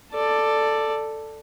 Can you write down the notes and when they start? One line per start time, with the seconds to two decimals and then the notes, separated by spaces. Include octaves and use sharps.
0.12 A4 D5